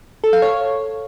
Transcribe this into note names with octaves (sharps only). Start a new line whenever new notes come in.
A4
F5
C#5